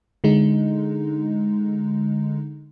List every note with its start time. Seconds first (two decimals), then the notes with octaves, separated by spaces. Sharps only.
0.24 D3 G#3 D#4